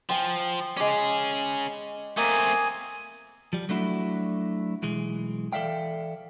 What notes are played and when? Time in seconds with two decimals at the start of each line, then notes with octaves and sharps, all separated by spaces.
0.10 F3 G5 G#5
0.77 G#3 C#4 G#4 D6
2.17 A3 A#3 C4 G#5 D#6
3.53 F3 G3
3.69 F#3 A3 D4 E4 F#4
4.82 B1 E3 G#3
5.53 E3 A4 D5 E5 F5 G5